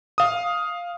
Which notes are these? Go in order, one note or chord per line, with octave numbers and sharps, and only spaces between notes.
F5 D#6